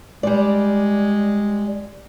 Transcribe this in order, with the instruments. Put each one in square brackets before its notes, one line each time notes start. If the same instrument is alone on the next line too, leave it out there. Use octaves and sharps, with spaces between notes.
[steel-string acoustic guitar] G3 D5 [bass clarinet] G#3